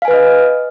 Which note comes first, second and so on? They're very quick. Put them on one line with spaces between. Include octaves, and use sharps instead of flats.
F5 G#5 B4 F6 D#5